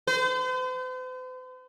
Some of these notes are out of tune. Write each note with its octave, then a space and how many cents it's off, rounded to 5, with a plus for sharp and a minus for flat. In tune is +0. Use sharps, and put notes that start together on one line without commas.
C5 -45